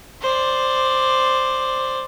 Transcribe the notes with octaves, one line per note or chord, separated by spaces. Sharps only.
C5 D5